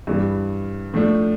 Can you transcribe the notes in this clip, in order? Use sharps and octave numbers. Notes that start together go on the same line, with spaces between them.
G2 E3 G3
A2 F3 A3 D4